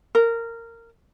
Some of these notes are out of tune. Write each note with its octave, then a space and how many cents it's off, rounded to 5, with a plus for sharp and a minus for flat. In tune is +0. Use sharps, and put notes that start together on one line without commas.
A#4 -15